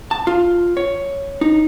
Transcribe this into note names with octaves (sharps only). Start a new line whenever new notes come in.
A5
F4
C#5
D#4